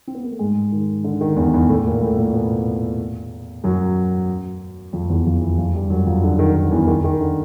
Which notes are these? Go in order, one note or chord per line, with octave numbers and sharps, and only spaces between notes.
C4
B3
A#3
A3
G#2 G#3
D#3
D3
D#3
E2 E3
E2 E3
A2 A3
A#2 A#3
A2 A3
A#2 A#3
B2 B3
F#2 F#3
F2 F3
E2 E3
F2 F3
E2 E3
F2 F3
G2 G3
F#2 F#3
F2 F3
D3
D#3
D#3
E2 E3
D#3
D#3
D3